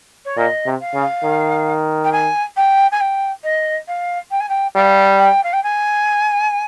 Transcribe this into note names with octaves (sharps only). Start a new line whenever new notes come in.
C#5
A#2 D#5
C3
F5
C#3
D#3
G5
G#5
G5
G#5
G5
D#5
F5
G5
G#5
G5
G3 F5
G5
F5
G5
G#5